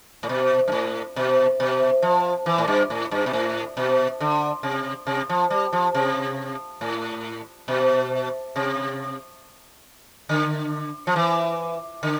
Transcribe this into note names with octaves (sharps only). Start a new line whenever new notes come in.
A2
B2
G2
A2
B2
B2
F3
E3
A2
G2
A2
G2
B2
A2
B2
D3
C3
C3
F3
G3
F3
C3
A2
B2
C3
D3
F3
E3
D3